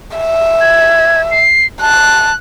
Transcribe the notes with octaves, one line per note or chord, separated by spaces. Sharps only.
E5
G#6
C7
A5 F#6